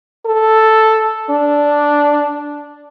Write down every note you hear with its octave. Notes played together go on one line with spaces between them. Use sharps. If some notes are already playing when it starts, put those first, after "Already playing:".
A4
D4